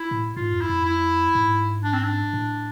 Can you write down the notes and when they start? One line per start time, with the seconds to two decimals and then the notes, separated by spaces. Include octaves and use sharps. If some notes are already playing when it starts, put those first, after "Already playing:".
Already playing: E4
0.11 A2
0.36 G#2 F4
0.53 F2
0.61 E4
0.69 F2
0.85 E4
1.35 G#2
1.84 D4
1.94 C4
2.04 D4
2.33 A2